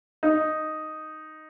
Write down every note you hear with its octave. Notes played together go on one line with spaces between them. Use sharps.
D#4